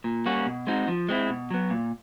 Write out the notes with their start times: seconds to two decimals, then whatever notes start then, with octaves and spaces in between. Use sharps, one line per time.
0.04 A#2
0.26 G3 A#3 C#4 F#4
0.46 B2
0.67 G#3 C4 D#4 F#4
0.88 F3
1.09 G#3 C4 E4
1.29 B2
1.50 F#3 B3
1.70 A#2